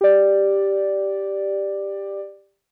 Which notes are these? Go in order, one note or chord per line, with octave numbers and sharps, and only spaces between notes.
G4 D5